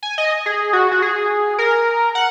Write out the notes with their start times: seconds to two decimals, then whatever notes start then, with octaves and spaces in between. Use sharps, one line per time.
0.03 G#5
0.18 D#5
0.46 G#4
0.73 F#4
0.92 F#4
1.02 G#4
1.58 A#4
2.15 F#5